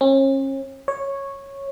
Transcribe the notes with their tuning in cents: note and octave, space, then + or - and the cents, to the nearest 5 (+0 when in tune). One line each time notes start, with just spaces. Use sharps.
C#4 -40
C#5 -5